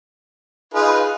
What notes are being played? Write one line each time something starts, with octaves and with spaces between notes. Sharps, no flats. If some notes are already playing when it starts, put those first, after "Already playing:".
D#4 F4 G#4 B4